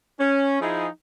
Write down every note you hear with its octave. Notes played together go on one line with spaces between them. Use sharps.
C#4
F3 D#4 E4 G#4